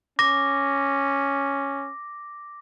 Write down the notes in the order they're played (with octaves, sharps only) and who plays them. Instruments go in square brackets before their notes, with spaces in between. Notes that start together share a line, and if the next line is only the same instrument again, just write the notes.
[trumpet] C#4 [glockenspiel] D6 A#6